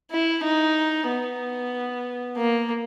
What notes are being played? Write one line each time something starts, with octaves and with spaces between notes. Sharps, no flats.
E4
D#4
B3
A#3